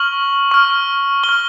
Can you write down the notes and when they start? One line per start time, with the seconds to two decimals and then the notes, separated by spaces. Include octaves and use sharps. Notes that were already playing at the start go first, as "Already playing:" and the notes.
Already playing: C#6 F6 F#7
0.51 C#6 F6
1.24 C#6 G7
1.29 F6